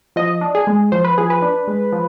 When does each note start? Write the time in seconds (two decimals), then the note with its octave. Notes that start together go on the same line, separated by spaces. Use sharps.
0.16 F3 D#5
0.41 D4
0.55 G#4
0.67 G#3
0.92 F3 C5
1.04 B4
1.18 F3 G#4
1.30 B4
1.42 D4
1.67 G#3
1.93 F3